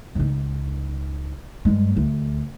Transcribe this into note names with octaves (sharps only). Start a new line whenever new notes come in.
C#2 D#4
G2 G#3
D2